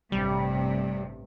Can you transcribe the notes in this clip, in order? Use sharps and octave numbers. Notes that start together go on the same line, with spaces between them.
A1 G2 C3 G3